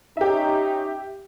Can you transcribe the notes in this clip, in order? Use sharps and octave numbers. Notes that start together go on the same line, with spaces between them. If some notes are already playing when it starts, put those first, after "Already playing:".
C#4 D#4 G4 E5